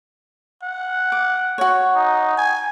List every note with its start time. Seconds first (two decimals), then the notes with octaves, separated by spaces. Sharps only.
0.63 F#5
1.12 D6
1.58 F#4 C#5
1.95 D#4
2.37 G#5